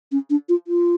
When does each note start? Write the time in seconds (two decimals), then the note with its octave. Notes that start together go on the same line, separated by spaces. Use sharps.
0.12 C#4
0.30 D4
0.49 F4
0.68 F4